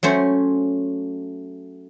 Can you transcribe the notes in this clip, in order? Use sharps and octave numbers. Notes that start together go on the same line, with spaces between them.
F#3 A3 C#4 C5